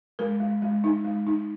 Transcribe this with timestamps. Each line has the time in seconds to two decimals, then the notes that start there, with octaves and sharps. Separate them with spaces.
0.19 G#3 A#4
0.40 G#3
0.62 G#3
0.84 D#4
1.05 G#3
1.27 D#4